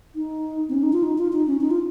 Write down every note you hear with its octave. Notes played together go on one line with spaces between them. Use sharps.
D#4
C4
C#4
D#4
F4
D#4
F4
D#4
C#4
D#4
F4